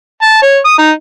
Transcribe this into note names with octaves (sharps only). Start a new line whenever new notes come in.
A5
C#5
D#6
D#4